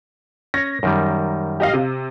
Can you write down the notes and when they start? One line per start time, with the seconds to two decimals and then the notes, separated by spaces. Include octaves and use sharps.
0.54 C#4 C#5 A#6
0.83 F#2 D#3 G3
1.60 G4 D#5 F5
1.73 C3